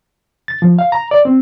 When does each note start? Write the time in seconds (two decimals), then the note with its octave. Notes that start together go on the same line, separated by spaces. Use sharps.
0.48 A6
0.62 F3
0.79 F5
0.92 A#5
1.11 D5
1.25 C4